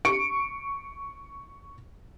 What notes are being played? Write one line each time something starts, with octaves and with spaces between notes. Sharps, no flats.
C#6 C#7 D7